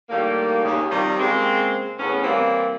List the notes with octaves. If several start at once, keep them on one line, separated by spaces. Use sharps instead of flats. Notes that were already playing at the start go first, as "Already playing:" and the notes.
A2 D#3 G3 A#3
D#2 C#3
C3 D#3 F3 G3
C#3 G#3 A#3 C4
E2 A2 B3 C#4
E3 G3 A#3 C4